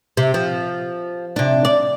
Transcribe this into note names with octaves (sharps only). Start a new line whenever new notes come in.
C3
F3
C3 D4
D5